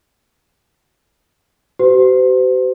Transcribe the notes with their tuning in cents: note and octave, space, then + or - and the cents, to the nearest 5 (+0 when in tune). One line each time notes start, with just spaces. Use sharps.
G4 -45 C5 -45